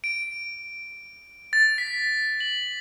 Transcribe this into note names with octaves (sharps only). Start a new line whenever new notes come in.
D7
A6
B6
F#7